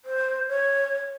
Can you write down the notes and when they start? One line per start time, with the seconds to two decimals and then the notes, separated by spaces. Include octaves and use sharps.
0.05 C5
0.48 C#5